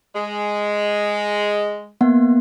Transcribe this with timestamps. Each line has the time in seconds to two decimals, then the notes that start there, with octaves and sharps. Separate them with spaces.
0.15 G#3
2.01 A#3 B3 F#5